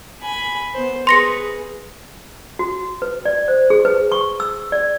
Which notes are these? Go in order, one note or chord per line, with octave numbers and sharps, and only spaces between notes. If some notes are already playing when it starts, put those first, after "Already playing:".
G#5 B5
B3 C5
G#4 B4 C6 A#6 C#7
F#4
B4
D5
C5
G#4
B4
C#6
E6
D5